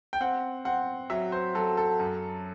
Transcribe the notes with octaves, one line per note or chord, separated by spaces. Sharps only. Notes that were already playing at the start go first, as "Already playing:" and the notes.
G5
C4 F#5
C4 F#5
F#3 E5
C5
F#3 A4
A4
F#2